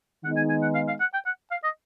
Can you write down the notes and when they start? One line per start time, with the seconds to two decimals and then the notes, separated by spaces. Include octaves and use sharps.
0.24 D#3 G#3 B3 D#4 F#5
0.37 G#5
0.49 G#5
0.62 F#5
0.75 F5
0.88 F5
1.00 F#5
1.13 G5
1.26 F#5
1.51 F5
1.64 D#5